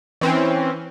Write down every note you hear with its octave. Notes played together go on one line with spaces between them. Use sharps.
E3 C4 C#4